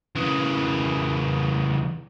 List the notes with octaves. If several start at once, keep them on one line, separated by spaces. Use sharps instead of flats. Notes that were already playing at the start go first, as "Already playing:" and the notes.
C#3 E3